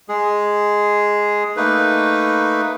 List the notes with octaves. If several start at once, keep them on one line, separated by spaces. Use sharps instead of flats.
G#3 G#4
A3 A#3 D#4 B4